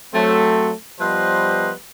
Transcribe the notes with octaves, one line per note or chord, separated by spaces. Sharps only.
F#3 A3 C4
F3 G3 B3 B4 C5 D#5